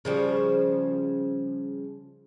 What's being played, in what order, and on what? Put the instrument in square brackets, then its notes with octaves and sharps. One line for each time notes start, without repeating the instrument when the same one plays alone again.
[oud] C#3 F3 G3